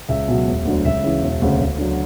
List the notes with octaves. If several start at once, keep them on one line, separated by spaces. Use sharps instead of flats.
C#2 E5
B2 F#3
E1
D2 D3 F#3
C#2 E5
C#3 E3
E1
D2 C#3
D2
D3 F#3